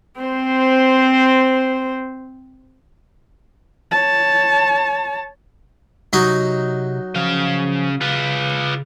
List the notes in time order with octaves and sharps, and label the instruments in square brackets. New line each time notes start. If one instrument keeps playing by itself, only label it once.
[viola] C4 C5
[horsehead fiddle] C#5 A5
[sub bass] C3 [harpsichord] F#3 D#4
[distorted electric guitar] C#3 F5 [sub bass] F3
[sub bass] C#3 [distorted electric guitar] F4 B4